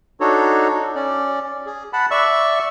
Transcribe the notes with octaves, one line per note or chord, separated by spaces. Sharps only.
D4 D#4 F#4 A4 C#5
C#4 D5
G#4
F#5 A5 B5
D5 E5 C#6 E6